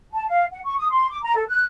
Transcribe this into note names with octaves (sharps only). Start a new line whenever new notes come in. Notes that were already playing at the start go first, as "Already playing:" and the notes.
A5
F5
F#5
C#6
D#6
C6
D6
A#5
A4
F#6